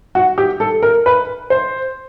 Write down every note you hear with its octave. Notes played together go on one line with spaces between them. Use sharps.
F#4
G4
A4
A#4
B4
C5